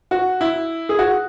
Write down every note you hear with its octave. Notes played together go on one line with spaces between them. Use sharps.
F#4
E4
G#4
F#4